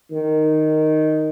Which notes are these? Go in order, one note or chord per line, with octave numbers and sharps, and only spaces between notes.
D#3